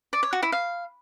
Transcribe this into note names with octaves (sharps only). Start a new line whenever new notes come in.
D5
C#5
F#4
E4
F5